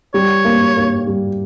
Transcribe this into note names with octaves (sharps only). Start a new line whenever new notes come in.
G3 C#5
A#3
A#3
G3